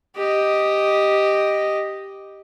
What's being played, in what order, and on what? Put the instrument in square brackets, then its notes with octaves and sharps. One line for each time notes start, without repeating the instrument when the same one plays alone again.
[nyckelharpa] G4 D#5